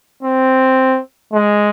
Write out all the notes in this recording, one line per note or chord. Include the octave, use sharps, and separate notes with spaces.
C4
G#3